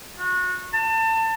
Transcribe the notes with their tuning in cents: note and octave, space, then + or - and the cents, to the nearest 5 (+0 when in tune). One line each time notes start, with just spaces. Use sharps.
F#4 -25
A5 +30